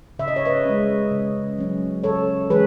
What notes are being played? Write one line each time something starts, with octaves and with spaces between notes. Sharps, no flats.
C#3 E5
D#5
C#5
B4 D#5
G#3 C#4
C#3
F#3 C#4
C#3 A4 C#5
E3 G#3 C#4 G#4 B4